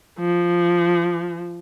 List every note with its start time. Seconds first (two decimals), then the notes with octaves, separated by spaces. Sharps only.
0.20 F3